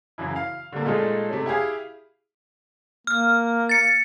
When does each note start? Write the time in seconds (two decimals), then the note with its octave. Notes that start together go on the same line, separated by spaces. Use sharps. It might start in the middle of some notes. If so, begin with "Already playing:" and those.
0.18 F#2 C#3 E3 E4
0.36 F5
0.72 D3 G3 A3 A#3
0.85 A#2 G#3 A3 D#4 F4 A4
1.30 C3 A3 C#4
1.46 E4 G4 G#4 F5
3.07 A#3 F6
3.69 A6 C#7